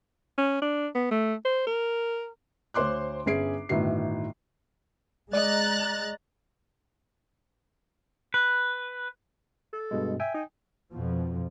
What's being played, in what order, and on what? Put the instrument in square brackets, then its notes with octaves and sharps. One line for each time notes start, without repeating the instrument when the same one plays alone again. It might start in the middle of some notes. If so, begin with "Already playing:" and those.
[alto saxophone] C#4
D4
B3
A3
C5
A#4
[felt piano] D2 C5 C#5 C6 D6 F#6
G1 C#4 G#4 C7 D7
G1 A2 D#3 F#4 C7
[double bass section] G#3 [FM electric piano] D5 D#5 [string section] A#5 F#6 A6
[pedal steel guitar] B4
[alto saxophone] A4
[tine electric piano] G2 B2 G#3
[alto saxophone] E5 [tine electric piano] G5 G#5
[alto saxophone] D#4
[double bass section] F2 B2 F3